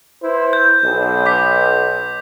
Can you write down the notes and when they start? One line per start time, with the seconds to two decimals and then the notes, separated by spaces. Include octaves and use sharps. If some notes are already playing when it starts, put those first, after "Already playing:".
0.22 E4 B4 C5
0.53 G6
0.83 B1
1.26 D6 B6